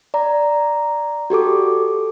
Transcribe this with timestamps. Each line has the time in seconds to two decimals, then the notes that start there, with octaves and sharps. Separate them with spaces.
0.14 D5 A#5
1.30 F#4 G4 A4 D6